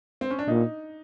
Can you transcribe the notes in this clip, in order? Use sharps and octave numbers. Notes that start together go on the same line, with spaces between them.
C4
C#4
D4
A#2 D#4